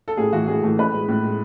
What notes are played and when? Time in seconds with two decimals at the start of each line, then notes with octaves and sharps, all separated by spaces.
0.08 A4
0.17 A2 G#4
0.33 E3 A3 F#4
0.48 A2 G#4
0.63 E3 A3
0.78 A2 B4
0.94 G#3
1.08 A2
1.23 G#3